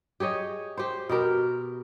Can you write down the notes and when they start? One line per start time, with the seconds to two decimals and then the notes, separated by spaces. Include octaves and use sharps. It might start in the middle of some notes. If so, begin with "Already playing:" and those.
0.20 G4 G#4 C#5 D#5
0.77 G4 C5
1.09 B2 G4 A#4